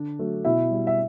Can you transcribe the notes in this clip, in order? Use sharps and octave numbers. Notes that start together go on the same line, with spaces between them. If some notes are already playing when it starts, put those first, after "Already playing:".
Already playing: D3 D4
F#3 A3
B2 E4 E5
G3
E5